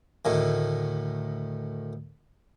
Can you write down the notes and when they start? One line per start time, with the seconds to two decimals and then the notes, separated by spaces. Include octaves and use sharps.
0.25 D2 A2 D#3